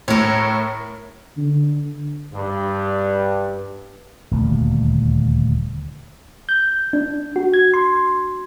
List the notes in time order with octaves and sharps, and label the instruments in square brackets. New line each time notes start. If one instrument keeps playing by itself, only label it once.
[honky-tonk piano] A2 [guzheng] A#4 C#5
[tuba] D3
[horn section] G2
[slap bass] D#1 D2
[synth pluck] G6
D4
F#4
G#6
C6